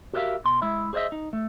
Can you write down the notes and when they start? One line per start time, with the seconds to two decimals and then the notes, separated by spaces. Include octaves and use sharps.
0.13 F#4 G4 A#4 D5 E5 F5
0.45 B2 C6
0.62 G#3 E4 E5
0.93 G#4 C5 C#5 D#5 E5
1.12 D#4
1.33 A3